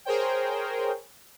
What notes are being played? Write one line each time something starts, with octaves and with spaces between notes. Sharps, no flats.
G#4 A#4 C5 C#5 G5